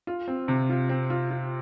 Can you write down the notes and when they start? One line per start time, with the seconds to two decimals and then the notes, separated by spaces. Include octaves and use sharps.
0.07 F4
0.28 C4
0.48 C3
0.70 F4
0.89 C4
1.10 F4
1.31 F4